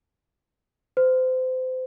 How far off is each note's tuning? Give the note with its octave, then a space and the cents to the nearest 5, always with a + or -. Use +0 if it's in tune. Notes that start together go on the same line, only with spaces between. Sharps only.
C5 -30